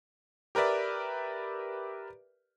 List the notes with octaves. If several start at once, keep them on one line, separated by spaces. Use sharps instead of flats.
G4 A#4 B4 D5 E5